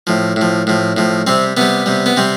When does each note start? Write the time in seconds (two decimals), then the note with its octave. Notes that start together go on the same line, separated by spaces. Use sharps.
0.07 A2 F3
0.36 A2 F3
0.67 A2 F3
0.97 A2 F3
1.27 C3 G3 C4
1.57 C3 G3 B3
1.86 C3 G3
2.06 B3
2.17 C3 G3 C4